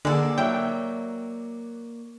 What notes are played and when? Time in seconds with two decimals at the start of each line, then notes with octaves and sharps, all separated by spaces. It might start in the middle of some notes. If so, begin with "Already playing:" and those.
0.05 D3 A#3 G#4 A4 D5 F#5
0.38 F#3 E5 G5 E6